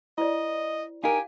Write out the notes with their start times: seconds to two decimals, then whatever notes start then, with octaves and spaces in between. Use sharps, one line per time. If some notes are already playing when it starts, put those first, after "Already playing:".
0.18 E4 C5 D5 D#5
1.04 D#4 G4 A#4 F5 G#5